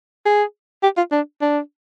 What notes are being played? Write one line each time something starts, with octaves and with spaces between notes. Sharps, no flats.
G#4
G4
F4
D4
D4